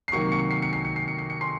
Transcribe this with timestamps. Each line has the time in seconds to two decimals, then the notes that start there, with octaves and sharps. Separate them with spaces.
0.08 C7
0.12 C3 D#3 F#3 A#3 C#6 C#7
0.32 C#6 C#7
0.51 C7
0.62 C#7
0.73 C7
0.85 C#7
0.96 C7
1.08 C#7
1.18 C7
1.30 C#7
1.41 C6 C7